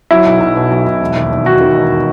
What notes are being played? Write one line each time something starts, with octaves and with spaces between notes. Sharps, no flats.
F#3 E4
B1
B1
B2
B1
B1
E1
D#2
E1
D#2 F#4
D#3
E1